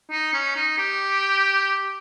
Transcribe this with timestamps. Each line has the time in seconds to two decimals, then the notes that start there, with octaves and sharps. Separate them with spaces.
0.11 D#4
0.34 C#4
0.56 D#4
0.78 G4